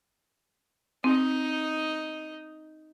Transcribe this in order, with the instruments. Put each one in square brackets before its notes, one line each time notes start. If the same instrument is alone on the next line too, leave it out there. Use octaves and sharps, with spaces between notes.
[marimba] C4 [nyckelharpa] D#4 D#5